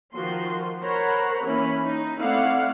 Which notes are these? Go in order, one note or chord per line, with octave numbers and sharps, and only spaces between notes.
D#3 F3 F#4 C6
A#4 C5 C#5 F#5 A#5 B5
E3 A#3 C#4 E4 B5
D#4
A3 C4 E4 D5 F5 F#5